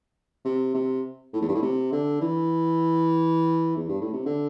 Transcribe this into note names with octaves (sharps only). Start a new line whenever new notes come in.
C3
C3
A2
E2
G2
A2
C3
D3
E3
E2
G2
A2
C3
D3